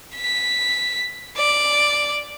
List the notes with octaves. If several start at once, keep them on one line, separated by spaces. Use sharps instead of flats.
B6
D5